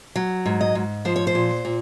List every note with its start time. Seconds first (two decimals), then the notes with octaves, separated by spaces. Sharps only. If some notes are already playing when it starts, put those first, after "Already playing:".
0.16 F#3
0.46 G#2
0.61 D#5
0.75 G#2
1.05 F3 C5
1.16 C#5
1.27 C5
1.35 A#2
1.65 A#2